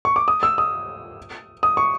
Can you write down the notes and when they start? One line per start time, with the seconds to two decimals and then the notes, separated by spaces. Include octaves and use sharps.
0.05 C#6
0.16 D6
0.28 D#6
0.43 E6
0.58 D#6
1.63 D#6
1.77 C#6